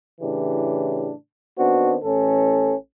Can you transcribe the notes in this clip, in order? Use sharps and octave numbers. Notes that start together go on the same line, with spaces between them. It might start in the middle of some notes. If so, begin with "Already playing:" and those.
A2 C#3 E3 D4 G4
D#3 B3 C4 D4 F#4
A1 A2 E3 C#4 A4